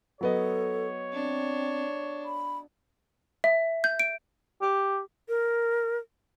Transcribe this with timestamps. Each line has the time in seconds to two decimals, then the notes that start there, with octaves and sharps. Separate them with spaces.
0.21 F#3 B3 A4 C#5 D#5
1.13 C4 D4
2.25 B5
3.44 E5
3.84 G6
4.00 D7
4.61 G4
5.29 A#4